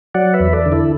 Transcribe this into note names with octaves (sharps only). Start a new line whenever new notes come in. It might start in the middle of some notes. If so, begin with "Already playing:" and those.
F#3 D5 F#5
B4 E5
E2
A4 D5
D3
E4 A4